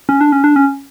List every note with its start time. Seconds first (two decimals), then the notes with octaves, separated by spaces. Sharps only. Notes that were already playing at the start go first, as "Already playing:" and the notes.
0.09 C#4
0.21 D4
0.32 C#4
0.44 D4
0.56 C#4